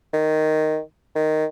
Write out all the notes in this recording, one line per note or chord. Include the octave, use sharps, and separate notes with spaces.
D#3
D#3